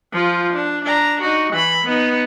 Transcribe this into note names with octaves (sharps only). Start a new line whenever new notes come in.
F3 F4
D4
D4 A#5
D#4 F#4
E3 B5
B3 D#4